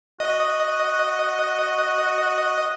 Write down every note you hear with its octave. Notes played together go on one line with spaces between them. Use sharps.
F#4 D#5